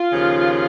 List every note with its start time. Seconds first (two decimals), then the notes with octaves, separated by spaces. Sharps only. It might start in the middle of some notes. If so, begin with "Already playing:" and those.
Already playing: F4
0.13 D#2 C#3 F3